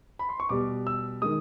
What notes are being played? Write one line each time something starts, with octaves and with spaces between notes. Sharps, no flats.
B5
C6
C#6
B2 G3 D6
E6
D#3 G#3 D#6